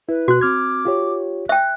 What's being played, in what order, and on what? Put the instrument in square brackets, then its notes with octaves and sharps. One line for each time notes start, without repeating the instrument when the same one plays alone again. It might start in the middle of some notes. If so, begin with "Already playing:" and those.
[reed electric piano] E4 [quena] B4
[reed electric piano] B2 F#6 [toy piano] F#4
[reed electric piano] C4 F6 G#6 [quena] D6
[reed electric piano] F4 G4 C#5
[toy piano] E5 G5 [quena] F#6